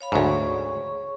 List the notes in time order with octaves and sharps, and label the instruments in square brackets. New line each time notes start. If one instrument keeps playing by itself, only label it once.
[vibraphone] C#5 F5 B5
[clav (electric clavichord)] D2 G#2 [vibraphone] G#4 C#5 C#6